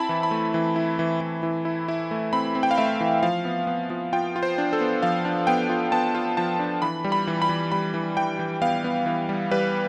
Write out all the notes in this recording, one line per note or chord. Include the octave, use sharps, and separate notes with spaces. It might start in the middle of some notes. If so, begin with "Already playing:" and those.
Already playing: C4 E4 A5 B5
E3
B5
A3
E3
E4
E3
E3
E3
E4
E4
A3
C4 B5
C4
G5
F5
A3 E5
E3
F3 F5
B3
B3
F3
F4 G5
F4
C5
D4
A4
B3
F3 F5
D4
B3 G5
F4
B3 A5
F4
F3 A5
D4
E3 B5
G3
B5
E3
B5
E3
G3 B5
E3
E3 G5
E3
B3 F5
B3
E3
G3
G3 B4